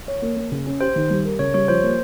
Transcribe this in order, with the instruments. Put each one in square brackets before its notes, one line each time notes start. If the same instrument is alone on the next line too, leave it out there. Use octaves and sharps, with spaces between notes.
[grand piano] C#5
A#3
A#3
C#3
C#4
[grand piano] G4 [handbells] C5
[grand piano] D#3
G3
A#4
[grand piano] C#3 [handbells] C#5
[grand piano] G3 [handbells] C#5
[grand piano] F3 [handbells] C5
[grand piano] A#3